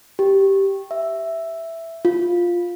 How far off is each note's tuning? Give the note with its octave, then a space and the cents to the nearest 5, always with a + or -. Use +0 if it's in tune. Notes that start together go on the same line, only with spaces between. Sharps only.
G4 -5
E5 +5
F4 +5